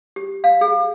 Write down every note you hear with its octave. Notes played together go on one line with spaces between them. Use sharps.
G4
F5
G#4